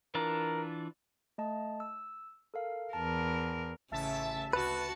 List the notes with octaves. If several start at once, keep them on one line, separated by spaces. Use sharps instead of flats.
E3 D4 F4 A#4
A3 D#5 A5
E6
A4 A#4 F5
E2 A#4 A5
A1 C#3 E5 A5
D2 F#4 B4 A5 C#7